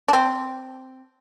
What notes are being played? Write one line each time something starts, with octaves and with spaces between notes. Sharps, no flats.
D4
C4